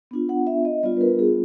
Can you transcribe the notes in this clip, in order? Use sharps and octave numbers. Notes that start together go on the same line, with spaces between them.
B3 D4 F4
F#5
E5
D#5
G3 B3 D4 F4 D5
B4
A#4
G#4